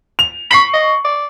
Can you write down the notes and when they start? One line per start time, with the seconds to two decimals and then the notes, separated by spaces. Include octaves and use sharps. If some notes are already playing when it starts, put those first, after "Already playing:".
0.19 F7
0.51 B5 C#6 C7 F#7
0.74 D#5
1.05 D5